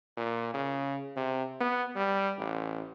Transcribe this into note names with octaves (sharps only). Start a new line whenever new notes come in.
A#2
C#3
C3
B3
G3
A1